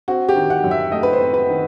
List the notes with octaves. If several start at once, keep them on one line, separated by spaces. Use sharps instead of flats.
C4 F#4
G4
D#3
F#5
F#2
E5
A3 D#5
B4
C5
C4
B4
D#3